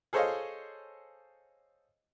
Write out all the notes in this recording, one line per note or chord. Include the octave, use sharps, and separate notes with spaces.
G#4 A4 C5 C#5 D#5 F5